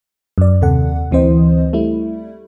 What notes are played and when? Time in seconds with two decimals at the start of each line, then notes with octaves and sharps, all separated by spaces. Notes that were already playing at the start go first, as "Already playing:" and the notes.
0.38 F#2 D5
0.62 D#2 C3 A4 F#5
1.11 D2 E3 C4 C5 D#5
1.73 G3 A3 E4